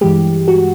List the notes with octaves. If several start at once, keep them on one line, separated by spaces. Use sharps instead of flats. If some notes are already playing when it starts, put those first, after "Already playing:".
G2 E3 G#3 G4
F#4